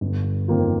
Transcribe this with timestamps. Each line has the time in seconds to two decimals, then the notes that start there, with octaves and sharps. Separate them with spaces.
0.01 G1
0.48 F2 D#3 A#3 F4